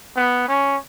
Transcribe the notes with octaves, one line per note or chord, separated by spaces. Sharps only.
B3
C#4